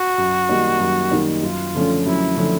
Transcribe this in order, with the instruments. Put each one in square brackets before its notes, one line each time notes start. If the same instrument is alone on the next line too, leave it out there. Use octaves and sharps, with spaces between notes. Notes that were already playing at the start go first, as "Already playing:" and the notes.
Already playing: [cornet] F#4
[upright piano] F#2
D#3 G3 A#3 D#4
F#2
D#3 G3 A#3 D#4
[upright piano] F#2 [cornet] F4
[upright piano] D3 F3 A3 C#4
[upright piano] F#2 [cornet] E4
[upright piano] D3 F3 A3 C#4